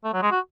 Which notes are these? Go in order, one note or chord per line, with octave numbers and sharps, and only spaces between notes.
A3
F#3
G#3
F#4